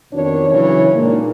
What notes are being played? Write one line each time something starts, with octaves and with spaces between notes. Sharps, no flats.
F2 B2 D#3 D4 C#5
C#3 E3 F#3 C#4 C#5
A#2 G#3 A#3 D4 D#4